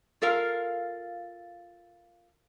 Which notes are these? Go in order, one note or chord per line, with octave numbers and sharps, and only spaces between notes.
F4 A4 A#4 F5